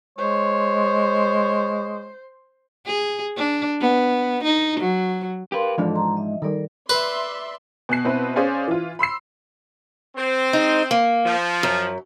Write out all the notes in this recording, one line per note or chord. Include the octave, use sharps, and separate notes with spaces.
G#3 C5 C#5
G#4
D4
B3
D#4
F#3
G4 A#4 B4 F5 C6
G#2 E3 F3 D4 A4 D#5
A#5 C6
D#5 E5
D#3 G3 A4 A#4 D5
B4 D5 E5 C6
B2 G#5 F#6 C7
B2 B3 C4 E4 B4
C#4 G#4 C5 D5 F5 G#5
E3 F4
B5 C6 E6 C7
C4 C5
G#3 D#4
A#3
F3
F#2